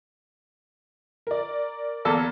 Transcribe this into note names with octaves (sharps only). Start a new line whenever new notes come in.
A#4 D5
E2 A#3 A4